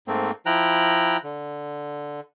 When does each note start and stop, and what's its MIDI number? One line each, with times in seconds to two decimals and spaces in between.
0.08 0.31 44
0.08 0.31 57
0.08 0.31 58
0.08 0.31 60
0.46 1.17 53
0.46 1.17 64
0.46 1.17 79
0.46 1.17 82
0.46 1.17 90
1.24 2.20 50